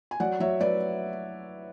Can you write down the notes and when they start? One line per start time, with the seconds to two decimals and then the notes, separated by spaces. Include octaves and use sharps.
0.11 G#5
0.20 F#3 D5 F#5
0.40 F#3 C#5 E5
0.61 F#3 B4 D5